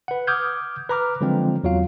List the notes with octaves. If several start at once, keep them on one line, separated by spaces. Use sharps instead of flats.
B4 F#5
D6 D#6 F6 G6 G#6
B4 A#5 D6 F6
D3 F3 F#3 G#3 C4
E2 F#3 F4 F5